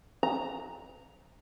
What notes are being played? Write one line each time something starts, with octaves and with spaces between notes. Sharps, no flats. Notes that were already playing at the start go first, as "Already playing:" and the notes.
A#5